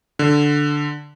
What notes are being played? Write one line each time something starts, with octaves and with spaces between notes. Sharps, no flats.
D3